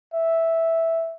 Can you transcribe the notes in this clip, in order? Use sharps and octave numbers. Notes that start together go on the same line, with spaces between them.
E5